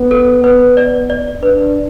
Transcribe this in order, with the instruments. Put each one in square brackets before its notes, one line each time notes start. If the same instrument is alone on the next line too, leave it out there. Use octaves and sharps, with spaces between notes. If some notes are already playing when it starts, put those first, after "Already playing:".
Already playing: [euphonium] B3
[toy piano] A4
[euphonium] B3 [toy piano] B4
[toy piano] D5
D5
[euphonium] D4 [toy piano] B4